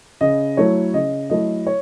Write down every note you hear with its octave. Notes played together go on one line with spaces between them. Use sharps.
C#3 D#5
F#3 A3 E4 C#5
C#3 D#5
F#3 A3 E4 D#5
C#5